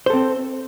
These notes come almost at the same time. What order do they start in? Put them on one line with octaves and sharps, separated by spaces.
C5 A4 C4